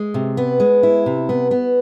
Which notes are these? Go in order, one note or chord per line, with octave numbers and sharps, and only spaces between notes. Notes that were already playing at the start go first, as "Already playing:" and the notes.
Already playing: G#3
C3
B3
G#3
E4
C3
B3
B3